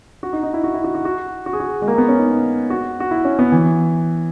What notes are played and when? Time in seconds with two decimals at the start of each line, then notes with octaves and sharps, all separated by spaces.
0.23 F#4
0.33 D#4
0.43 D#4
0.54 E4
0.64 F#4
0.74 E4
0.84 F#4
0.95 F#4
1.05 F#4
1.46 F#4
1.53 G#4
1.60 F#4
1.82 G#3
1.88 A#3
1.98 B3
2.08 C#4
2.19 D#4
2.70 F#4
3.00 F#4
3.11 E4
3.25 C#4
3.39 B3
3.52 E3